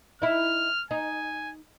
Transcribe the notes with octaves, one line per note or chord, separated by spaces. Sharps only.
D#4 E4 F6
D#4 G#5